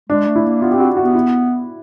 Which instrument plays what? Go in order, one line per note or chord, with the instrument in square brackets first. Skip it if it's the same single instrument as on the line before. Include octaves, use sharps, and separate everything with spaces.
[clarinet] G#3 [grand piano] D4
[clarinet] A3
[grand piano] E4
[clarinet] A#3
[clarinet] B3 [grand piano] F4
[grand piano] G4
[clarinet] C4 [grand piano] F#4
[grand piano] F#4
[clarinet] B3
[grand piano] E4